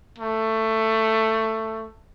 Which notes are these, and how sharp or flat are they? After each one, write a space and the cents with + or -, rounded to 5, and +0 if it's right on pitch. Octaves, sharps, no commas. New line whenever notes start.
A3 +15